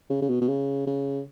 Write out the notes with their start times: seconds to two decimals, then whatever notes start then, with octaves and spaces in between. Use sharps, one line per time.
0.10 C#3
0.22 C#3
0.29 B2
0.41 B2
0.48 C#3
0.87 C#3